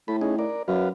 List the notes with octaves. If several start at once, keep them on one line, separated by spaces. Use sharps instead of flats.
A2 A4 B5
C#4 D#4 G#4
A#4 D5
F#2 F#4 B4 F5